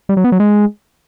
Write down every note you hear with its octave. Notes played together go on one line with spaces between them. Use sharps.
G3
F#3
B3
F#3
G#3